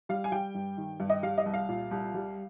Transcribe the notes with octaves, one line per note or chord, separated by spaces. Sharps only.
G3 F5
G#5
G3 G5
G2
D#3
G2
D#5
G3 F5
D#5
C2
F5
A#2
C2
G3